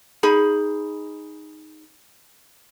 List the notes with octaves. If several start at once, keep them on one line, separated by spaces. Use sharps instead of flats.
D#4 G#4 B5